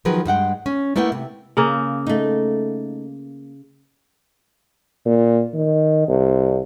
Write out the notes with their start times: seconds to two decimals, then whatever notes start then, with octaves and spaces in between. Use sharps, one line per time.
0.05 D#3 F3 F#3 G#4 A#4 B4
0.25 G2 G#3 F#5 G5
0.66 C#4
0.96 A3 A#3 E4 B4 F#5 G5
1.12 C3
1.57 C#3 A#3
2.07 A3 D#4
5.05 A#2
5.54 D#3
6.08 C2